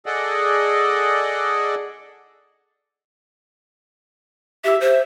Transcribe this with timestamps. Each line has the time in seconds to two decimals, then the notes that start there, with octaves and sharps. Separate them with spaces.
0.06 G#4 A4 D5 D#5 F#5
4.64 G4 E5
4.81 C5